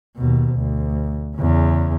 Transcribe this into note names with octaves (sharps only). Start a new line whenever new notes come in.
D#2 B2
D2
E2 C#3